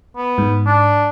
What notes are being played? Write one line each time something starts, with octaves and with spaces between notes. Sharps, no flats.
B3
G#2
D4